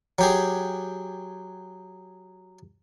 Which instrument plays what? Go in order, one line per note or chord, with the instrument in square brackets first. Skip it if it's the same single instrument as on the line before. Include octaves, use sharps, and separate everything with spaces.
[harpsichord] F#3 G4 G#4